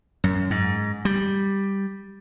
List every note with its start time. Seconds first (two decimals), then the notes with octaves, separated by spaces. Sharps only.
0.24 F#2
0.50 G#2
1.05 G3